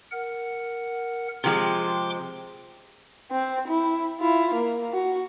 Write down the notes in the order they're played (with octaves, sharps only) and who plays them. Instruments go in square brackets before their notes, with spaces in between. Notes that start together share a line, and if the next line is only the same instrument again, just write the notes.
[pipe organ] A#4 F#5
[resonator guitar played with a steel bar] C3 F3 G#3 [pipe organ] G5 C6 D6
[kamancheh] C4
E4
E4 F4
A#3
F#4